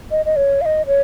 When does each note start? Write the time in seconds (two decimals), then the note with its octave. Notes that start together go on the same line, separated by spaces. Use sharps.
0.11 D#5
0.25 D#5
0.36 C#5
0.61 F5
0.65 D#5
0.86 C#5